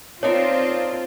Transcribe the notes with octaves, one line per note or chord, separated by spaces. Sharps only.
C4 D4 D#4 F4 A#4 C#5